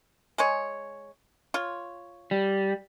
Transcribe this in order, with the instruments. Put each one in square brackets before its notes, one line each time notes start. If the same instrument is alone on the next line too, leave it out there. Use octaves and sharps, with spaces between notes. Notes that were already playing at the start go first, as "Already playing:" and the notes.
[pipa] G#3 G#4 C#5
F4 C#5
[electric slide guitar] G3